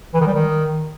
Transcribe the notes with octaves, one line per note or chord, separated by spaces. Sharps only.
E3
D#3
G3
D#3